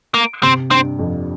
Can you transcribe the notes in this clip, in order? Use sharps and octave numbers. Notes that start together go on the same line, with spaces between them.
A#3
C3 C4
G2 C4
F2